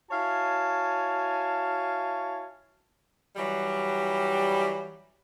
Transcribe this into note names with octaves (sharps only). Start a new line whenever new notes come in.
E4 F#4 C#5 F5 G#5 A5
E3 F#3 G3